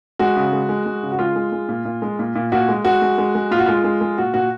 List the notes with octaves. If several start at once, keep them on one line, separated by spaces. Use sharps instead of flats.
G#3 F#4
C#3
G#3
G#3
G#3
C#3
F#4
G#3 F4
G#3
G#3
A#2
A#2
G#3
A#2
A#2
A#2 F#4
G#3
G#3 F#4
G#3
G#3
G#3
A#2 F4
F#4
G#3 F4
G#3
G#3
A#2 F#4
A#2 F#4